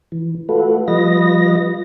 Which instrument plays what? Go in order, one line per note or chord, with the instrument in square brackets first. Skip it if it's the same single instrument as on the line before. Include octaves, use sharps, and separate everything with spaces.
[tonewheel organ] E3
A3 F4 F#4 A4 B4
F3 G3 F4 B4 D#5 A#6